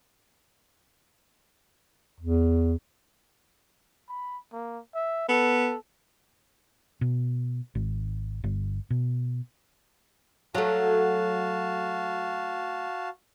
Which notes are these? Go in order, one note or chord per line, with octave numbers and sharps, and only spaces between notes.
E2
B5
A#3
E5
B3 A4
B2
G#1
G1
B2
F#3 A3 F#4 F5 A5